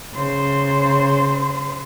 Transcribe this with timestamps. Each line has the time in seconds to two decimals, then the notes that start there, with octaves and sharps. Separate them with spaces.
0.14 C#3 C5